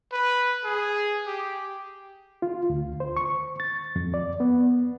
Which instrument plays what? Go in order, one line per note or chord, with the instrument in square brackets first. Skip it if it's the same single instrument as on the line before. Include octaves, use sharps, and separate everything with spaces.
[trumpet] B4
G#4
G4
[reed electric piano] F4
D2
C5
C#6
A6
F2
D5
B3